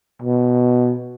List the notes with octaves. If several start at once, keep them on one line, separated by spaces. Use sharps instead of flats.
B2